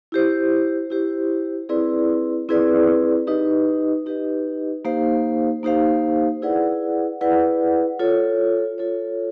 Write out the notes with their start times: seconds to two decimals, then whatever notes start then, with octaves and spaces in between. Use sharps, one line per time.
0.12 E4 G4 C5
0.90 E4 G4 C5
1.69 C4 E4 G#4 B4 D5
2.49 C4 E4 G#4 B4 D5
3.27 D#4 G4 B4 D#5
4.06 D#4 G4 B4 D#5
4.85 A#3 D#4 G4 C5 F5
5.63 A#3 D#4 G4 C5 F5
6.42 E4 G#4 B4 D5 F#5
7.21 E4 G#4 B4 D5 F#5
7.99 F4 A4 C#5
8.78 F4 A4 C#5